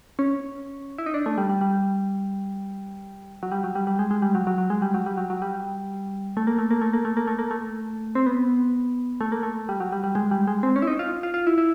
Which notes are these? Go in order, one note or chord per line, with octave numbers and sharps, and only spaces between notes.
C#4
E4
D#4
D4
A3
G3
G3
G3
F#3
G3
F#3
G3
G3
G#3
G#3
G3
F#3
F#3
F#3
G#3
G3
F#3
G3
F#3
F#3
G3
A3
A#3
A3
A#3
A3
A#3
A3
A#3
A3
A#3
A3
C4
B3
A3
A#3
A3
G3
F#3
G3
G3
G#3
G3
G#3
C4
C#4
E4
D#4
F4
F4
F4
E4
E4